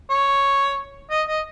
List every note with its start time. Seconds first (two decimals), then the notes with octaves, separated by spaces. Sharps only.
0.10 C#5
1.11 D#5
1.28 D#5